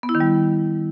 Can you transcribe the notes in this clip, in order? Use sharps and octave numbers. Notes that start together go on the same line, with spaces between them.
B3
E4
D#3
G3